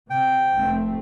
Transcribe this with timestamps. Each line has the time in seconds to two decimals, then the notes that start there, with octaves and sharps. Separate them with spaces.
0.10 C3 G5
0.56 F1 A3 C4